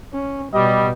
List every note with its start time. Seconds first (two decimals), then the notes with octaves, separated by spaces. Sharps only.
0.14 C#4
0.53 B2 G3 D#5